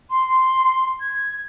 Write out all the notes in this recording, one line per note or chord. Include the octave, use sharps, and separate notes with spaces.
C6
G#6